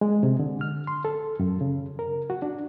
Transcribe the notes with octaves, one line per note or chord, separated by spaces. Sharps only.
G#3
C3
D3
F6
C6
A4
F#2
C#3
A#4
F#4
D4